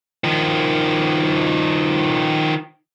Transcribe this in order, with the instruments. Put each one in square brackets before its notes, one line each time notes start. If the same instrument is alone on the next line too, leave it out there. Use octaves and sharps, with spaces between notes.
[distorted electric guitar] D#3 F3